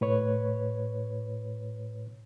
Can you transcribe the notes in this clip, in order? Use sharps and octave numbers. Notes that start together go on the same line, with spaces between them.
A2 B4 C#5